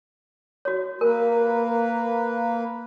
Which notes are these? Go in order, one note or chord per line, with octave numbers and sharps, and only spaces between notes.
F#4 C#5
A#3 A#4 B4